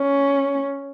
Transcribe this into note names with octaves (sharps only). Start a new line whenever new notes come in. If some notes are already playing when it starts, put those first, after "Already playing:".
Already playing: C#4